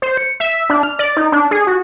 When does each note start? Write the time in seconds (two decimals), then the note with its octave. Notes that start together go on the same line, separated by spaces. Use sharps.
0.02 C5
0.17 C#7
0.40 E5
0.70 D4
0.83 F6
0.99 D5
1.17 D#4
1.32 D4
1.51 G#4
1.67 F#4